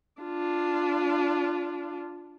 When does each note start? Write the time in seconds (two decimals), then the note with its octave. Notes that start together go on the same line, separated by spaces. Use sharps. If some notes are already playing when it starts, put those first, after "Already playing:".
0.22 D4 F4